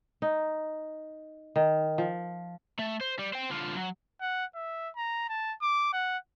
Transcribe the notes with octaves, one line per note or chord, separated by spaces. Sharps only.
D#4
D#3
F3
A3
C5
G3
C5 G5
D3 F4
F#3
F#5
E5
A#5
A5
D6
F#5